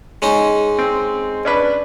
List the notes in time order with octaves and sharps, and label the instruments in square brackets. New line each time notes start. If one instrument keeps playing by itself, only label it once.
[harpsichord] G#3 C#4 D#4
[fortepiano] C4
C#4 D4 B4